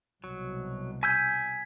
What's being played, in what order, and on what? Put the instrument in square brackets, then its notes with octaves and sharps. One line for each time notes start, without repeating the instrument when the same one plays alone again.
[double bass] C2 B2 [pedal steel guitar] F#3
[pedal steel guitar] G#5 E6 G6 [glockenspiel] G#6 B6